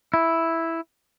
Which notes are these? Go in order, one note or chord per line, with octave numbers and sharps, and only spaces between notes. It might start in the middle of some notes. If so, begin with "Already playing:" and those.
E4